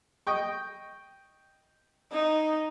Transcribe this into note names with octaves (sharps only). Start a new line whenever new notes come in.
D#5 G5 C#6
D#4